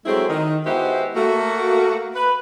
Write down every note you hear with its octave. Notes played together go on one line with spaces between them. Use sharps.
F#3 G#3 A3 C4 E4 G#4
D#3
G#3 B3 E4 F#4 G4 C5
A3 A#3 F#4
B4